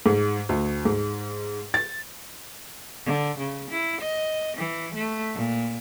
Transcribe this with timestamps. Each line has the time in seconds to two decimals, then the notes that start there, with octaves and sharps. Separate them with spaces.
0.06 G#2
0.49 D2
0.85 G#2
1.74 A6
3.06 D3
3.38 C#3
3.71 E4
4.01 D#5
4.57 E3
4.95 A3
5.34 A#2